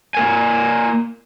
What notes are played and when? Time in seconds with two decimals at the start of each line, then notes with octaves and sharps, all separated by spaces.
0.15 A#3 A#4 G#5